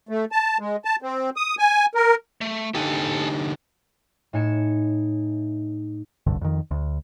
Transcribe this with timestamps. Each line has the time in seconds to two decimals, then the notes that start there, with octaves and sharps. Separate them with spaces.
0.09 A3
0.32 A5
0.60 G#3
0.85 A5
1.02 C4
1.36 D#6
1.59 G#5
1.95 A#4
2.41 A3
2.75 D3 D#4 G4 A4 G#5
4.33 A2 D#4 G#5 C#7 E7
6.27 F#1 C2 G2 D3
6.41 F2 D#3
6.71 D2